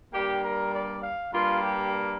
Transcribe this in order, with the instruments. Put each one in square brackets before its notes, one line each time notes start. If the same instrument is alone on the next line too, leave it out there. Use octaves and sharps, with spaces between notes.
[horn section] G2 G3 A#3 G4
A#4
D5
F5
G2 G3 A#3 F4
G4